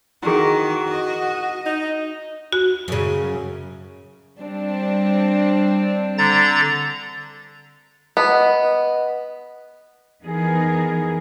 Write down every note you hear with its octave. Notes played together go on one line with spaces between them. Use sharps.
D#3 E4 F#4 G#4
D#5
D#4
F#4
F#2 C#3
G3 C4 D4
D3 A#5 A6
B3 D#5
E3 F3 B3 D#4 G#4 A#4